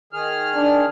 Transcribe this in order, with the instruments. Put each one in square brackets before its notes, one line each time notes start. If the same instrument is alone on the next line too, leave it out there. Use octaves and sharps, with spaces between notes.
[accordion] D#3 G#4 F6
[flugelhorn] D4